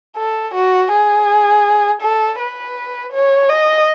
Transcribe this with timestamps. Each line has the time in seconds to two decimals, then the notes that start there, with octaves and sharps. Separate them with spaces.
0.16 A4
0.54 F#4
0.91 G#4
2.01 A4
2.39 B4
3.13 C#5
3.50 D#5